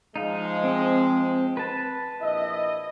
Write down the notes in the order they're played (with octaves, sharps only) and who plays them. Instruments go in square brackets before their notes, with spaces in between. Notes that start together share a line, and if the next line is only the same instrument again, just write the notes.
[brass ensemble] F3 G#3 [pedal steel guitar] D#4 F5
[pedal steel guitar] C4
B4 A5
[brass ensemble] A#1 E4 D#5